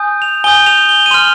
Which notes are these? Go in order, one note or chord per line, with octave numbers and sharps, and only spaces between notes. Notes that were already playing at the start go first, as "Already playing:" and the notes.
Already playing: G#5 D#6 G6
F7
G#5 D#6 G6 G7
F7
G7
D#7
C6 F6 F7